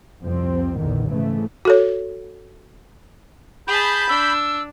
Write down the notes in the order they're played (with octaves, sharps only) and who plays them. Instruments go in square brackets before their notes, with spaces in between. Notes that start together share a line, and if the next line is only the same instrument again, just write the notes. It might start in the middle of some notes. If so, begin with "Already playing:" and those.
[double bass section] C2 F2 F3 C4
A#1 E2 D3 D#3
G#2 C#3 E3 A3
[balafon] F#4 A4 C#5
[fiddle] G#4 A5 [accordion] B5 G6
[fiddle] D4 [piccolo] E6